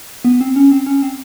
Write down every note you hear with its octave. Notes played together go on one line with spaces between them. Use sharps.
B3
C4
C#4
C4
C#4
C4